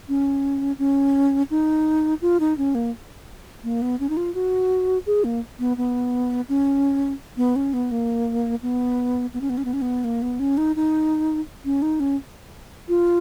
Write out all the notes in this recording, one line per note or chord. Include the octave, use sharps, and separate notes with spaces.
C#4
C#4
D#4
F4
D#4
C#4
A#3
A#3
B3
C#4
D#4
F4
F#4
G#4
A#3
B3
B3
C#4
B3
C#4
B3
A#3
B3
B3
C#4
B3
C#4
B3
C#4
B3
A#3
B3
C#4
D#4
D#4
C#4
D#4
C#4
F4